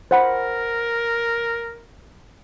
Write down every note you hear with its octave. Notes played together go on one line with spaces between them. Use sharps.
A#4 C5 F#5 B5